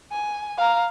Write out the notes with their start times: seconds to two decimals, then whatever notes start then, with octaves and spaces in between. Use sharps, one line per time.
0.12 G#5
0.58 F5 A#5